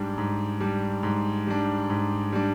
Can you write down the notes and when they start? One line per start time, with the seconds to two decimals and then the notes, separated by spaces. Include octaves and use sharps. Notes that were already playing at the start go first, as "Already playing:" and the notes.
Already playing: G#2 G3 D4
0.18 G#2
0.60 G3 D4
1.03 G#2
1.47 G3 D4
1.90 G#2
2.32 G3 D4